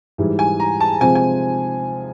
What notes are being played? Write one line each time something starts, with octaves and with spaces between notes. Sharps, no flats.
G#2 E3 G3
G#5
A#5
A5
C3 F3 G#3 C4 G#5
G#5